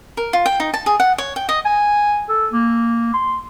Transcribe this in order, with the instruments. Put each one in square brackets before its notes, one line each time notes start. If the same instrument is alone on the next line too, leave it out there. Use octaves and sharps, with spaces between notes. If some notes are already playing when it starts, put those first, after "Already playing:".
[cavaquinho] A#4
F4
G5
D#4
A5
G#4
F#5
C#5
G5
D#5
[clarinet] G#5
A4
A#3
C6